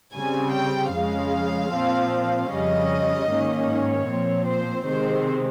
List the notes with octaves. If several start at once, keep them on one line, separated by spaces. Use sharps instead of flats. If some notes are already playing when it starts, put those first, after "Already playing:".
C#3 G3 C4 G#5
G5
F2 C#3 G#3 F5
A#2 F3 C4
F2 C#3 G3 C#4 D#5
G#2 D#3 A#3 C#4
C#5
A#2 F3 C4
C5
C3 D#3 G#3 C4 C5